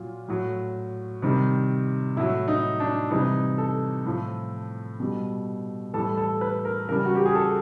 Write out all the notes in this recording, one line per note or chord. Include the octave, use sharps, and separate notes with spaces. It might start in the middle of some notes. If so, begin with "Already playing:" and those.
Already playing: A#2 F#3 F4
A2 F#3
C3 D#3 G3
A2 F#3 E4
D#4
D4
C3 E3 G3 D#4
A4
A2 F3
B2 G3
A2 E3 G3 A4
A4
B4
A#4
C#3 E3 G3 A#4
F#4
G4
G#4
A4